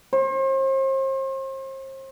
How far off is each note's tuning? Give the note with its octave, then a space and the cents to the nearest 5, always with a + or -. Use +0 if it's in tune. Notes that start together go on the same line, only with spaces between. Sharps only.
C5 +40